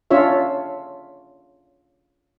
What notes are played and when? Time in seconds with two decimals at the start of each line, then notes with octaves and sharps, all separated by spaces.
0.11 C#4 D4 F4 C#5 E5